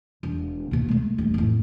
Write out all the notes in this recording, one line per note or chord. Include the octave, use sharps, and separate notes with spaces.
E1
D#2 B2
G#3 A3
D#1
F2 A2